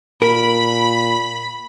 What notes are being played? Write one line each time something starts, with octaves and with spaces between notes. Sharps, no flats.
A#2 A#4 B5